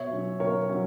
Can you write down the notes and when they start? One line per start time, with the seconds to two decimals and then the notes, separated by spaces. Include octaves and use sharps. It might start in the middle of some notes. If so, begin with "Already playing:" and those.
Already playing: B2 C#5 E5
0.11 F#3 C#4
0.40 B2 A#4 C#5
0.70 F#3 C#4